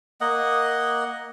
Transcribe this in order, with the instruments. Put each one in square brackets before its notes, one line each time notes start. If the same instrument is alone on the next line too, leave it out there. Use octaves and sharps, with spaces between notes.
[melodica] A#3 D#5 F#5